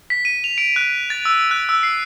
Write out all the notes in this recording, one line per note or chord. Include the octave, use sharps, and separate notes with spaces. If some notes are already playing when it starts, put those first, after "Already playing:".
B6
D#7
F7
D7
F#6
A6
E6
F#6
E6
C7